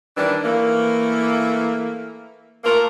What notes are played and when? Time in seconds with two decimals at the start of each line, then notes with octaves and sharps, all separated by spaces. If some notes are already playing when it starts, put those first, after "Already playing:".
0.17 D#3 E3 G3 D4
0.44 E3 A3 A#3
2.64 A3 A#3 F4 A4 A#4